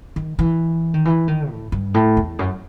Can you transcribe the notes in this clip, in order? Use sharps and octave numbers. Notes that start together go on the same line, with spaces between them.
D#3
E3
D#3
E3
D#3
A2
G2
A2
E2
F#2